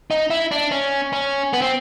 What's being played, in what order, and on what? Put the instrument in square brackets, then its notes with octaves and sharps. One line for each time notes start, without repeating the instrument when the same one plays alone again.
[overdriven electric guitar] D#4
E4
D4
C#4
C#4
B3
C4